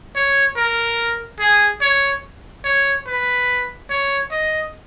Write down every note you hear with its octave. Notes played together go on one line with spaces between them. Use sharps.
C#5
A#4
G#4
C#5
C#5
B4
C#5
D#5